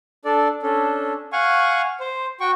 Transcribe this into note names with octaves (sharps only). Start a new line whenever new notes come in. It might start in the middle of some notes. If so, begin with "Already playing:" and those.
D4 A4 D5
C#4 D4 A4
F5 F#5 G#5 C#6
C5
F#4 G5 C#6